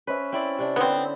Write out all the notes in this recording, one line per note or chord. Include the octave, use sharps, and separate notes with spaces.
C#4 B4 C5 E5
C4 E4 D5
C3 D4
D3 B3 C4
B5